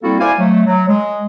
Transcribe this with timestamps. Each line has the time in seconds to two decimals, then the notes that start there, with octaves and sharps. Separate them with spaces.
0.03 G3 A#3 C4 E4 F#4 A4
0.20 E4 C5 D5 F5 G#5
0.39 F#3 A3
0.67 F#3
0.88 G#3